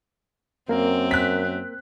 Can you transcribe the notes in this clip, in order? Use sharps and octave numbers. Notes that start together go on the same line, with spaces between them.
F#2 A#3 C4 A#4
F#6 B6